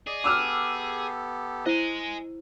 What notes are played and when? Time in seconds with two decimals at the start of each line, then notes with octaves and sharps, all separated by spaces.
0.07 G#4 D5 D#5
0.24 B3 G4 A4 D6 E6 F6
1.66 E4 C5 D#5 G#5